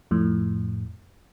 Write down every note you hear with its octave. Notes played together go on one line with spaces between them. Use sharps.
F2 A2